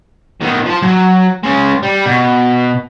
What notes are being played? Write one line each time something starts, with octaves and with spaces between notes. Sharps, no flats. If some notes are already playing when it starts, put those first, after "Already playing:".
D#3 B3
F3 A5
F#3
G#3 C#4
G3
B2